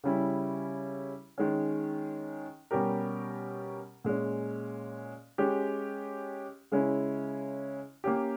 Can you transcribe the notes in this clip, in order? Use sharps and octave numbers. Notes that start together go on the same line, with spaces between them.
C#3 G3 C#4 E4
D#3 G#3 C#4
B2 G3 C#4 G4 A#4
A#2 G#3 C#4
G#3 C#4 G4
C#3 G#3 C#4 E4
A#3 C#4 G4